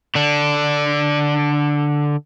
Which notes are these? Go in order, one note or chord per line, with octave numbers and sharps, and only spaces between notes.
D3 D4